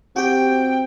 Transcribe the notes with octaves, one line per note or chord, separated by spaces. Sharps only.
C4 F#4 G4 G5